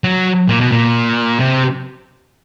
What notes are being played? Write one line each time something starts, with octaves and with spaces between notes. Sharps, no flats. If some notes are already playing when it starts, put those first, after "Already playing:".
F#3
A#2
B2
A#2
C3